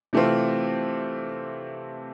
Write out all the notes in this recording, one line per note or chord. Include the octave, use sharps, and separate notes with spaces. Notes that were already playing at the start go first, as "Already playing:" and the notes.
C3 E3 A3 C4 F4